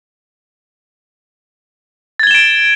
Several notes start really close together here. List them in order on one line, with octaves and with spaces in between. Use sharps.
A6 G#6 G7 E7 D7